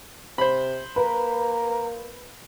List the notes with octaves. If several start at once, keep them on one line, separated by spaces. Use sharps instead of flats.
C3 C5 B5
A#3 B4 A#5